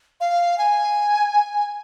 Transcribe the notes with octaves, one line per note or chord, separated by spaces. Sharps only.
F5
G#5